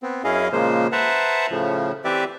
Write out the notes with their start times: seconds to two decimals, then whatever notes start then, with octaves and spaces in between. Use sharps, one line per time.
0.03 B3 C4
0.24 F#2 C#4 E4 G#4 D#5 F5
0.52 A#2 C#3 F3 G#3 A#3 C5
0.92 B4 C5 E5 F#5 A5 A#5
1.51 A2 C#3 F3
2.05 E3 C4 G4 B4 D5 E5